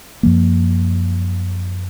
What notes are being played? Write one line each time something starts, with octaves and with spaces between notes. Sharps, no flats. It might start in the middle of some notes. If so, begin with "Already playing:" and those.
F#2 F3 A#3